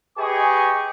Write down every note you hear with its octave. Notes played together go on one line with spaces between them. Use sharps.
G4 G#4 B4 D#5 G#5 C#6